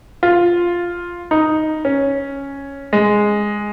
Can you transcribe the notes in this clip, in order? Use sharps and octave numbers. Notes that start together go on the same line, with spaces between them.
F4
D#4
C#4
G#3